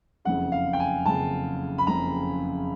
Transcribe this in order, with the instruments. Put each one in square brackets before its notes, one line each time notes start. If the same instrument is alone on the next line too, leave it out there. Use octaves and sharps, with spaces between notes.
[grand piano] F#1 F2 C#3 F#5
F5
G5
G#5
F#1 F2 C#3 A5
B5
F#1 F2 C#3 A#5